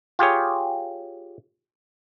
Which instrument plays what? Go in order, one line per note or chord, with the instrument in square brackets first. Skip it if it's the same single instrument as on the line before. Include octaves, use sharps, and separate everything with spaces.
[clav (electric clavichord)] F4 G4 G#4 C#5